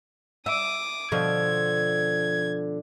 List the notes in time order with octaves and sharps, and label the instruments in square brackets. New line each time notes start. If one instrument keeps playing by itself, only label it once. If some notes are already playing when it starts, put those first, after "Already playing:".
[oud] E5 [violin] D6 D#6
[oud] B2 D3 F3 [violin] G#6